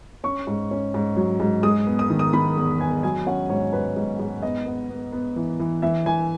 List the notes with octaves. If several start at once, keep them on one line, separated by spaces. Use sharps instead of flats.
C#4 C#6
G#2
C#4
G#2
F#3
G#2
G#3 D#6
B3
D#6
D#3
D#6
D#3 B5
E2
B3 G#5
F#3 G#5
C#4 F#5
G#2 C#5
G#2 B4
G#2
G#2
B3 D#5
B3
B3
B3
E3
E3
E3 E5
E3 G#5